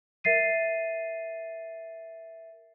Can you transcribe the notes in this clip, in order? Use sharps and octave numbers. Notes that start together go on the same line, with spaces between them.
A#4 E5 A6 C7 D#7